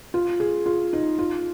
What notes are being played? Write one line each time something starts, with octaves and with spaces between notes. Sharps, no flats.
F4
G#4
F4
D#4
F4